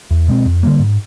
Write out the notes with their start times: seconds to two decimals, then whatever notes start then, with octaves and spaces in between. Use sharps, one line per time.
0.11 E2
0.28 B2 G#3 C4
0.46 F2
0.63 D3 G3 A#3
0.79 G#2